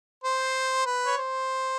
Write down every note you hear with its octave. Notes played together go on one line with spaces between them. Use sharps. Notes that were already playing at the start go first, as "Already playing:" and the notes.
C5
B4
C#5
C5